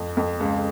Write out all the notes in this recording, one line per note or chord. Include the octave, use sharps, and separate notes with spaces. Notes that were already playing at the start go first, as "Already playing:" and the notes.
Already playing: F2
F2
C#2